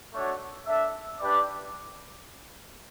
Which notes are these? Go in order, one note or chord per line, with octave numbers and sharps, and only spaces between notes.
A3 D4 F#4 C#5
D4 A4 E5
D4 G4 B4 D5